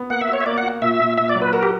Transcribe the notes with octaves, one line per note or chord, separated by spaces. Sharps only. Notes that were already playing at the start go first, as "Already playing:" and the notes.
Already playing: B3
A#3 F#5
E5
F#4
C#5
E5
A#3 D5
F#5
F#4
A#2 E5
A#2
A#2 E5
D5
F#3
B4
F#4 A#4
G4